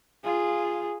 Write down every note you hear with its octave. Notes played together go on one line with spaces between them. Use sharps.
F4 G#4